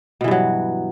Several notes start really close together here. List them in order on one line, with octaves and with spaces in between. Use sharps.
B2 E3 G2 F#3